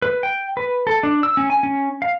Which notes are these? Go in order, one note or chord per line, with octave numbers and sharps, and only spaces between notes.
B4
G5
B4
A4
D4
E6
C#4
G#5
C#4
F5